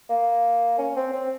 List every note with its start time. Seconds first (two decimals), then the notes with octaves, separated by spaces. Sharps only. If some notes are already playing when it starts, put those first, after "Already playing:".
0.10 A#3
0.78 C#4
0.96 C4
1.12 C4